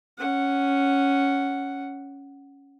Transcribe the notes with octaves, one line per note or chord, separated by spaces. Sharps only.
C#4 F#5